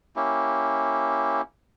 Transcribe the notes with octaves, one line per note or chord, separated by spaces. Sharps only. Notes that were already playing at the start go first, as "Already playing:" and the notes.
A#3 C#4 E4 G4